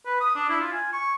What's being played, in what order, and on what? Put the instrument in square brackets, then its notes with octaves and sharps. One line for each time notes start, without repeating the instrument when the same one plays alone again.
[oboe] B4
D#6
D4
E4
F4
G#5
C#6